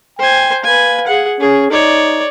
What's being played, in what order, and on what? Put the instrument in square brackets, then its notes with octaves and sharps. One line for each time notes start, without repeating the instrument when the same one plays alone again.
[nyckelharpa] C5 G#5 [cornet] G5
[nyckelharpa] B4 G#5 [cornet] F5
[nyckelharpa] G#4 F#5
[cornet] C#4 [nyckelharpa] G#4
[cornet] D#4 [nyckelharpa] C#5 D5